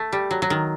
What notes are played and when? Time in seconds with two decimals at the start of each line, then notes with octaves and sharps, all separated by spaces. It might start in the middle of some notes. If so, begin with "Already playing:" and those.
Already playing: A3
0.13 G3
0.31 F#3
0.42 F#3
0.50 D#3